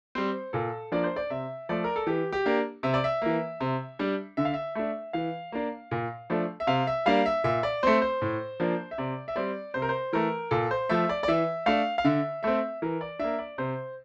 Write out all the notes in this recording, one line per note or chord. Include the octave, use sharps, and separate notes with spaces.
G3 C4 C5
A#2 A4
F3 A#3 D4 D5
C5
D5
C3 E5
F3 A3 D5
A#4
A4
E3 G4
G4
A#3 D4
C3 E5
D5
E5
E3 A#3
C3
G3 D4
D3 E5
F5
E5
A3 D4 E5
E3 F5
A#3 D4
A#2
F3 A3 D4
E5
C3 F5
E5
G3 A#3 D4 F5
E5
A#2 E5
D5
A3 C4 C5
C5
A2
F3 A#3 D4
E5
C3 D5
E5
G3 C4 D5
C3 C5
A#4
C5
E3 A3 A#4
A#2 A4
C5
F3 A3 E5
D5
D5
E3 E5
A3 D4 F5
F5
D3 E5
A3 C4 E5
E3 A#4
D5
A#3 D4 E5
D5
C3 C5